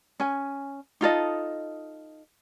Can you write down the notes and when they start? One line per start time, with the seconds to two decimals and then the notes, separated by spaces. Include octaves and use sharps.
0.20 C#4 G#5
1.01 D#4 F4 A4 D#5